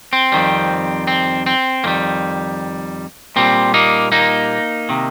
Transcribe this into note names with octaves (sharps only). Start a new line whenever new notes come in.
C4
F2 D#3 G3
C4
C4
F2 D#3 G3 A#3
A#2 G3 C4
A#3 D#4
A#3 D#4
C3 D#3